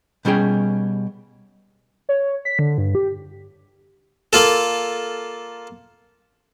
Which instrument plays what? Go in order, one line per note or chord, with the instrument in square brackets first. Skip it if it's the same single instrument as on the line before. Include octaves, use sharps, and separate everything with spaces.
[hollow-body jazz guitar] B2 G3 C#4 G#4 G5
[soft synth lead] C#5
B6
D3
G2
G4
[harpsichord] A#3 F4 A4